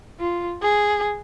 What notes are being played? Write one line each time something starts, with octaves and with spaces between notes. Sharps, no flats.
F4
G#4